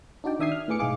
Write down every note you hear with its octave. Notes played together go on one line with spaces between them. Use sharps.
D4 D#4 F#4 D5 G5
D#3 D4 E5 D#6 G#6 C7
F6
A2 A3 B3 G#4 D6 C#7
B1 G#2 G#3 G#4 F5 D6